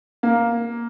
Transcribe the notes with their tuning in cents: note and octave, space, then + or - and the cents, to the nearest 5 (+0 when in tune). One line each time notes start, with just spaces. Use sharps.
A#3 +5